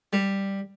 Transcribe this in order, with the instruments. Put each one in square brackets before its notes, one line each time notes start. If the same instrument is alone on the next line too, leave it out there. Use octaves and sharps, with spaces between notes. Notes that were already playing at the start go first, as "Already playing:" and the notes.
[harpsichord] G3